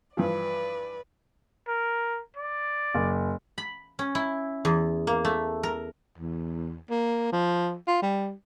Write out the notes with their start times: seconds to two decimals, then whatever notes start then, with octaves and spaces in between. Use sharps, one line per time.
0.17 G2 E3 F3 B4 D5
1.68 A#4
2.37 D5
2.94 F#1
3.58 B5
3.99 C#4
4.15 E4
4.65 E2
5.07 A#3
5.25 A3
5.63 A#4
6.18 E2
6.90 A#3
7.32 F3
7.87 F4
8.02 G3